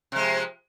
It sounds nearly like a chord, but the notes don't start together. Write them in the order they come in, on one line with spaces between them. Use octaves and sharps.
C3 G#3 F3